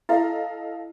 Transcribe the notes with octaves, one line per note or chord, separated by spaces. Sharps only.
E4 A4 D#5 F5